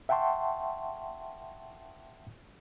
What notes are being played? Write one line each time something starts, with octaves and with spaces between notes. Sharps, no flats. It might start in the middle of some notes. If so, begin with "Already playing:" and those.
E5 F#5 G5 A5 C6 C#6